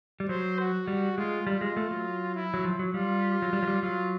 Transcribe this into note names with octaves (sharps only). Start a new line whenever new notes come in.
G3
F#3 C5
F#4
G3
G#3 F4
G3 F4
G#3
A3
F#3
E4
F#3
F3
F#3
G3 F4
F#3
G3
F#3
G3
F#3 F4